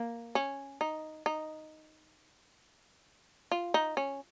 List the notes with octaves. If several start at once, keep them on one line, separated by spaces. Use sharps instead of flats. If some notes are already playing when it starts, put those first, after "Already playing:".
Already playing: A#3
C#4
D#4
D#4
F4
D#4
C#4